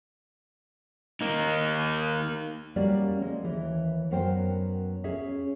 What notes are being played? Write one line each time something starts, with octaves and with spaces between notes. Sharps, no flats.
A#3 D#4
G3 A#3 C#4 F#4 D5
G#3 C4
D#2 E3
F#2 F#3 B3 A#4 C5 G5
C#4 G#4 E5